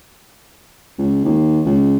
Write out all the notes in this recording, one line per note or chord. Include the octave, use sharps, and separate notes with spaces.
C#2
D#2
C#2